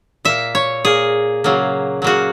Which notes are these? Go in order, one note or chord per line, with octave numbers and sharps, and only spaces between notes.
A#2 A#3 E5
C#5
A#2 A#3 G#4
C#3 F#3 A#3
C#3 F#3 A#3 F#4